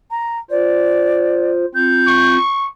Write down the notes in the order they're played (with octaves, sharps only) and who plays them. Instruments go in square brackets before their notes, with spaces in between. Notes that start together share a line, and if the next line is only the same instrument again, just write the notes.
[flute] A#5
[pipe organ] F4 C5 [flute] D5
[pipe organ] C4 F4 [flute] G6
[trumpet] C#6